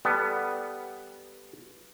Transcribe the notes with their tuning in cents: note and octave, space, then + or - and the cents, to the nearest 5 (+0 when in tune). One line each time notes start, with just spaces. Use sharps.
G3 +0 B3 +0 A4 +0